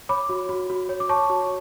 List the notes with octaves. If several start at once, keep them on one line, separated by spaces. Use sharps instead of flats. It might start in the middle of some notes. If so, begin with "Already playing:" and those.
C#5 B5 D6
F#4
F#4
F#4
C#5
D6
C#5 A5 C#6
F#4